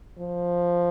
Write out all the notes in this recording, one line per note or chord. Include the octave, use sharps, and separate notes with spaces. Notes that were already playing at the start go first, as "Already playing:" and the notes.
F3